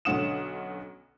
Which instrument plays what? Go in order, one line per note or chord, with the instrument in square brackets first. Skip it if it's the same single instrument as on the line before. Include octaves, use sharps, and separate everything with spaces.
[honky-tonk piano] B1 D3 C#4 F#5 D#6 E7